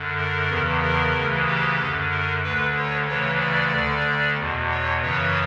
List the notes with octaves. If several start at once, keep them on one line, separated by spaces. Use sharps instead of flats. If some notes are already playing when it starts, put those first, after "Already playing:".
Already playing: F#2 D3
A#4
E2 C#3 E3
A#4
D2 C#3 E3
G4
F#2 D3
A#4
D2 D3 B4
C#5
D2 C#3 E3 C#5
D5
D2 D3
E2 B2
C#5
F#2 C#3 E3 C#5